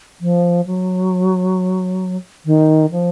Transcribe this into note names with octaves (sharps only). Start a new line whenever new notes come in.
F3
F#3
D#3
F3